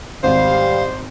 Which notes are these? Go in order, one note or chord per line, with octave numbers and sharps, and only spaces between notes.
G#1 G3 C5 F5